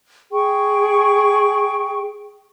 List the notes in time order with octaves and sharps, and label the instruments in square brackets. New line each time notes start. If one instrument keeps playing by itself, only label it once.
[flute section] G#4 G5 C#6